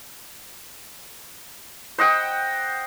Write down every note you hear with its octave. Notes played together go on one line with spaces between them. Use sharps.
C5 D#5 F#5 G5